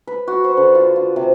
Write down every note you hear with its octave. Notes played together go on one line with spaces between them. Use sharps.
B4
F#4
C5
D3
F4
F4
C3